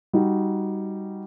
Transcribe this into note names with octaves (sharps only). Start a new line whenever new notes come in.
G3 D#4 F#4